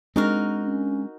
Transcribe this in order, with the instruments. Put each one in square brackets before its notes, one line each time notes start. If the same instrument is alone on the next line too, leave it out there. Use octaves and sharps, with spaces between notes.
[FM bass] G#3 [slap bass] C4 D4 [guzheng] D#4 F#4 A#4
[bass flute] C#4